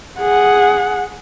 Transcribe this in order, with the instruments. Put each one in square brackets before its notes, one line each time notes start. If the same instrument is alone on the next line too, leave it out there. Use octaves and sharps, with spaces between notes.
[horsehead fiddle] G#4 F#5